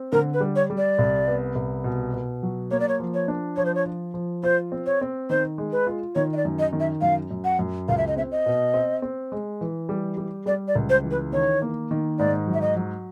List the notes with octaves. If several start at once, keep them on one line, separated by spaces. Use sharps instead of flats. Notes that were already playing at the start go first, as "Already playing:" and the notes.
Already playing: C4
D3 A#4
B4
G3
C#5
G3
D5
C2
B3
C2
B2
B2
F#3
A#3 C#5
D5
C#5
F3
C#5
D4
F3 C#5
C5
C#5
F3
F3
F4 C5
C4
C#5
C4
D#3 C5
G#3
B4
F4
D#3 C#5
D#5
D5
F#2
D#5
D#3
E5
F#2 F5
F#2
F#5
F#2
C#2 F5
E5
D#5
C4 E5
D#5
B2
C4
C4
G#3
E3
G3
G3
G3 D5
D5
C#2
C5
E3
B4
D#3 C#5
A#3
D#3
G#2 D5
F#3
E5
D#5
F#3